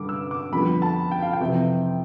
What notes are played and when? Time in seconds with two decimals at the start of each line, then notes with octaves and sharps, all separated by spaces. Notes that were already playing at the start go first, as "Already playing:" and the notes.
Already playing: G2 D3 G3 D6
0.09 E6
0.31 D6
0.52 F2 D3 G3 B3 B5
0.82 A5
1.11 G5
1.22 F5
1.33 G5
1.40 F2 C3 E3